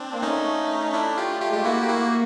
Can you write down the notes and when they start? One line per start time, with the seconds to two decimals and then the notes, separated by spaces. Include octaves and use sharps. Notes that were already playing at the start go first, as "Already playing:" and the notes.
Already playing: C4 D4
0.13 A#3
0.22 A3 C#4 D#4
0.93 D4 E4
1.17 F4 G4
1.41 F4 G4
1.47 G#3
1.53 A3 G4
1.64 A#3 E4 F#4
1.83 G4
1.89 E4 F#4